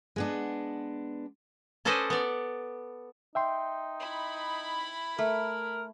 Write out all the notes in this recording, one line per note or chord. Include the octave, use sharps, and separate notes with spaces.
G#3 B3 D4
C#4 A4 B4 C5 D5 D#5
B3 D5
D#4 E5 G5 C6
E4 B5
A3 A#4